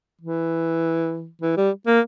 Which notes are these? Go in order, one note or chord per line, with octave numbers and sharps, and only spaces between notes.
E3
E3
G3
A#3